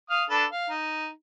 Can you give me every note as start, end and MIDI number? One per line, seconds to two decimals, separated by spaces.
0.10 0.24 77
0.10 0.24 87
0.10 0.24 89
0.30 0.45 62
0.30 0.45 69
0.30 0.45 71
0.51 0.69 77
0.70 1.09 63